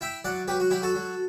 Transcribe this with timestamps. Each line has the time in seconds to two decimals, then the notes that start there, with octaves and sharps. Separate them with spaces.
0.01 E4 E5 G5
0.24 F#3 D5 F#5
0.48 F#3 G4 B4
0.60 F#4
0.70 F#3 E4 G4
0.82 F#4 A4
0.95 F#3